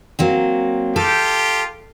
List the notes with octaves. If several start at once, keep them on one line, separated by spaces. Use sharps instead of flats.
F#3 A#3 C4
F4 G4 A4